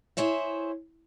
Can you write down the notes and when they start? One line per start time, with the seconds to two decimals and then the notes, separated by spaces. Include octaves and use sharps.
0.17 E4 G#4 C5 C#5 E5